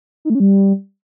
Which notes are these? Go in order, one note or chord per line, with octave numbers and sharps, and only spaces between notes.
D#4
A3
C#4
G3